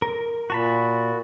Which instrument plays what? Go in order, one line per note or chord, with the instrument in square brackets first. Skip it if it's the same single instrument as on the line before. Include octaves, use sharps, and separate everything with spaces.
[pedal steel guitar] A#4
[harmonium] A#2 [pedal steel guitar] F#4 A5 B5